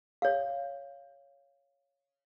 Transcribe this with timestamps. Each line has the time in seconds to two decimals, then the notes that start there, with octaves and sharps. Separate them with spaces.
0.22 C#5 F5